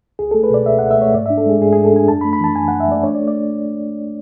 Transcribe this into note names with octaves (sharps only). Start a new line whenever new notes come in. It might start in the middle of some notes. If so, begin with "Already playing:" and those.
C#2 G#4
A3 A4
B4
B2 D5
C#2 E5
C#2 F#5
E5
A3 C#5
G#2 D5
D4 E5
A4
G#3 G#4
G#2 G#4
G#2 G#4
A4
D4 G#5
F#2 A5
B5
A3
B5
E3 A5
F#2 G#5
F#2 F#5
E5
A3 D5
D4 C#5
D5
A3
D5